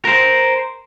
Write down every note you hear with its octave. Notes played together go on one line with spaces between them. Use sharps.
A#4 C5